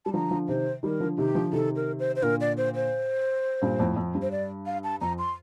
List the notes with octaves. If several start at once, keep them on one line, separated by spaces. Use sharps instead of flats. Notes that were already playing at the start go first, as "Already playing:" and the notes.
G3 A5
D3 F3 A#5
D3 F3
C3 D#3 C5
D#3 G3 A#4
D3 F3
C3 D#3 G4
D3 F3
C3 D#3 A4
A#4
C5
C5
A#2 D3 A#4
D5
C5
C5
G2 A#2
F2 A2
F2
G2
C5
D5
F5
A5
F2 A#5
C6